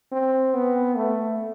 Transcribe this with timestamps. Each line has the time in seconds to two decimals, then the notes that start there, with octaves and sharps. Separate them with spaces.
0.12 C4
0.54 B3
0.96 A3